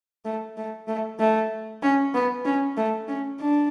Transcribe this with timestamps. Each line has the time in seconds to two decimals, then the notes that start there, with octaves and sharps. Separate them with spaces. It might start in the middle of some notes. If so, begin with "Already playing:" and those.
0.25 A3
0.57 A3
0.88 A3
1.19 A3
1.83 C#4
2.14 B3
2.45 C#4
2.77 A3
3.08 C#4
3.40 D4